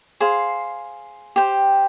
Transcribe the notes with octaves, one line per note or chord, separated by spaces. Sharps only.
G#4 C5 F5 C6
G4 C5 G5